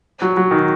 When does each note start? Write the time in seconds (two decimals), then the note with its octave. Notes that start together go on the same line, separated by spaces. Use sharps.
0.22 F#3
0.37 F#3
0.51 D#3